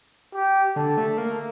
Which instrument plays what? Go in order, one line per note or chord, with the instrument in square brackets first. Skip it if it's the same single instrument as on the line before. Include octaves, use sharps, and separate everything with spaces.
[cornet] G4
[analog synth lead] D3 [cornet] A4
[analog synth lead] A3
A#3